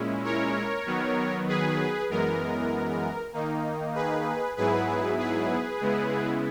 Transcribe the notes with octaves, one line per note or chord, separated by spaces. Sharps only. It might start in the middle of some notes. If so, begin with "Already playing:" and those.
Already playing: A#2 G#3 C#4 E4
A#4 C#5
D#3 F#3 B3
G#4 B4
F#2 E3 G#3 B3 A#4
D#3 A#3 D#4
G#4 B4
G#2 F#3 B3 E4 G#4 B4
G#4 B4
C#3 G#3 B3 E4